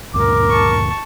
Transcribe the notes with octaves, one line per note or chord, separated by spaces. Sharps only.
D2 G2 A#2 A#4 D6
A5 C#6